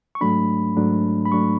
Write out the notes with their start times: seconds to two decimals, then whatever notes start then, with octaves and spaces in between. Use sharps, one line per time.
0.15 C#6
0.21 G#2 F#3 A3 D4 B5
0.76 G#2 F#3 A3 D4
1.26 B5
1.31 G#2 F#3 A3 D4 C#6